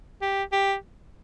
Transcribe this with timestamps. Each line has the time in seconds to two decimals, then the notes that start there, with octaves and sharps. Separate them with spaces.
0.21 G4
0.52 G4